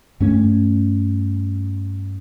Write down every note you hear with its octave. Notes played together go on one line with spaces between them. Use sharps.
G2 A3 C#4